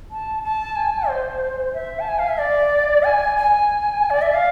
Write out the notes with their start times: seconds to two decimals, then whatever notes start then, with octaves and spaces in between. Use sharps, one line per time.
0.11 A5
0.43 A5
0.76 G#5
1.08 C5
1.74 E5
2.00 A5
2.09 G#5
2.19 F5
2.29 E5
2.38 D5
3.04 G#5
3.37 G#5
4.10 D5
4.22 E5
4.34 F5